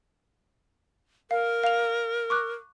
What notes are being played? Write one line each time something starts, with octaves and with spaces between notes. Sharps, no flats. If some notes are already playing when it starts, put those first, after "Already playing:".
A#4 F5
F5 F7
C#6 D6 F#6